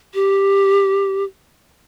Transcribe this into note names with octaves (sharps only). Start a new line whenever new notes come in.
G4